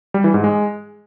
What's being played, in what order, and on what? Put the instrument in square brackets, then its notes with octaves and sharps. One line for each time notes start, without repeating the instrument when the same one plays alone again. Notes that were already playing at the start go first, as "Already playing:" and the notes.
[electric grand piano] G3
E3
G#2
G#3